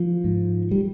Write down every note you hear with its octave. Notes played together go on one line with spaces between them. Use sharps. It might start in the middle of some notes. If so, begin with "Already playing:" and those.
Already playing: F3
G#2
G3